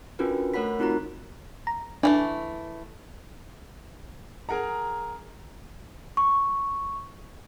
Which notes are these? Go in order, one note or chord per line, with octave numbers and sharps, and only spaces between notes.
C#4 D4 F4 F#4 A#4 B4
A3 A#4 C#5 F#5 B5 B6
C4 D#4 F4 F#4 A#4 A#5
A#5
E3 G3 A3 D4
G#4 A#4 F#5 A#5
C#6